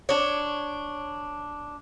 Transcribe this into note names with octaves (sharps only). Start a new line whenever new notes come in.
D4 C#5